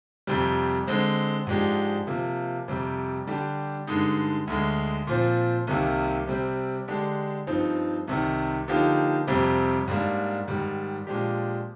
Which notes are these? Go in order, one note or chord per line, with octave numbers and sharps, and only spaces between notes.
F2 C3 G3
D3 G#3 C4
G#2 F3 G#3 D4 G4
C3 F3 A#3
F2 C3 G3
D3 G3 D4 G4
G2 D3 G#3 D#4
D2 D3 G#3
A#2 F3 C4
C2 C3 D#3 A#3
C3 G3 C4
D3 G#3 D4 G4
G2 F3 C4 D#4
C2 C3 D#3
D3 F3 A#3 D#4 G4
F2 C3 G3 C4
G#2 G3 A#3 D4
G#2 D#3 G3
A#2 F3 G#3 D4 G4